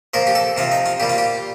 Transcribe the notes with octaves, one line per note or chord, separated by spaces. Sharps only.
A#2 F3 A#4
G4
A4
C3 F3 F4
D#4
F4
A#2 G3 G4
F4
G4